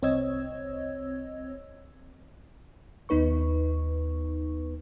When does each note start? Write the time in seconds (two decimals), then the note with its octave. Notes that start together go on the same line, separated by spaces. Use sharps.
0.02 C2 C4 C#5 D#5 E6 G#6
3.09 D#2 B3 D#4 B4 C#6